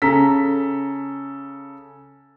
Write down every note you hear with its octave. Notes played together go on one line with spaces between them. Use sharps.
C#3 A4 A#5 B6